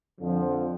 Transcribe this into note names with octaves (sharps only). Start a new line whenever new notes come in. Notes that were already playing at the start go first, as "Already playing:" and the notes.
F2 D3 F3